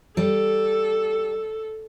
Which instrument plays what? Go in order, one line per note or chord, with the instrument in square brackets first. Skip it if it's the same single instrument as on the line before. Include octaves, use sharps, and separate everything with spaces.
[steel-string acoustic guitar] G3 [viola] A4